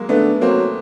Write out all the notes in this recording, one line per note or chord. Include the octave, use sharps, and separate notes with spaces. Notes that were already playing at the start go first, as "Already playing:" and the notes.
Already playing: F#3 G#3 A#3
D3 A3 B3
F#3 A#3 C4